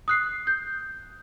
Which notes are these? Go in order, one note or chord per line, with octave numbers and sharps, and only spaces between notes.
D#6 F#6 C7
G6